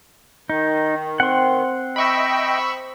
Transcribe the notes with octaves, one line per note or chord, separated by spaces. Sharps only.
D#3 D#4
C4 F#5 C6
D#5 E5 G5 B5 C#6 E6